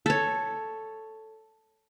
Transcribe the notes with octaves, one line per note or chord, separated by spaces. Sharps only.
A4 C#5